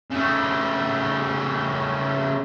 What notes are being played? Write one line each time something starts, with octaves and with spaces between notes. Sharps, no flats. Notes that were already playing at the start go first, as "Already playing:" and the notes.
C#3 A3